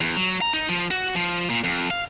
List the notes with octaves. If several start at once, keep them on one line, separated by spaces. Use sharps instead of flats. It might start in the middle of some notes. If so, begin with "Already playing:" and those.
E2
F#3
A#5
D#4
F3
F#4
F3
A#2
F2
F5